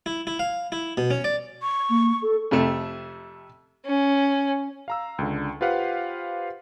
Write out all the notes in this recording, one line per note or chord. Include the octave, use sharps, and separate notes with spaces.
E4
E4
F5
E4
B2
C#4
D5
C#6
A#3
A4
F2 C3 A3
C#4
F5 A#5 E6
C#2 D3
F4 G4 B4 C5 F5 F#5